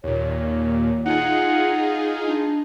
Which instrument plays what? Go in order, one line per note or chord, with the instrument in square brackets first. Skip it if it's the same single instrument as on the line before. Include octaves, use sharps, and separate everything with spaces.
[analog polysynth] D#2 A#2 [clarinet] C#5
[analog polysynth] D#4 F4 G#4 [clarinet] F#5
[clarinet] D4